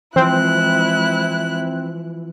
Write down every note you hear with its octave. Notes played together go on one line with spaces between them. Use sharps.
E3 F3 G#3 C4 E4 F#6